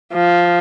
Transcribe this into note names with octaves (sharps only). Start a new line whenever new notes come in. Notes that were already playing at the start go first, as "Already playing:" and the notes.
F3